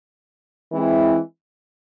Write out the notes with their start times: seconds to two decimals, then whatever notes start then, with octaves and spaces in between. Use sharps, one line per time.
0.72 E3 G#3 C4 E4